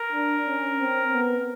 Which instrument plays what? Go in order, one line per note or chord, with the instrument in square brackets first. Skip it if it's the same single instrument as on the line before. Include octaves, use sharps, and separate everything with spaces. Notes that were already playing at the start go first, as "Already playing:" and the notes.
Already playing: [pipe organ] A#4
[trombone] D4
C#4
C4
B3